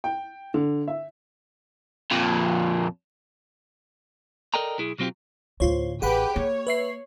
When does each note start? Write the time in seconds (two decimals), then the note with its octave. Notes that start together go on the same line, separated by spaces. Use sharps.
0.04 G5
0.54 D3
0.88 E5
2.11 F2 A#2
4.54 A4 A#4 D5 D#5 G5 A#5
4.78 B1 E4 G#4
4.99 B2 F#3 C4 F4 G4
5.60 D2 A2 F4 C5 C#5
6.02 A1 G4 G#4 B4 F#5 G5 B5
6.36 A#3 C#5
6.67 B4 E5 C7